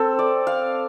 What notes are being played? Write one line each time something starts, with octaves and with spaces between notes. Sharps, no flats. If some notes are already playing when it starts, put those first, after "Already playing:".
Already playing: C4 A4
D5
F5